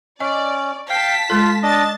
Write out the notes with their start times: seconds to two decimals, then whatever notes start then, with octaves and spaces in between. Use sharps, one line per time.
0.20 C#4 D5 D#5
0.90 F5 G5 A5 B6
1.30 G#3 F4 A4
1.63 D4 D#5 A5 A6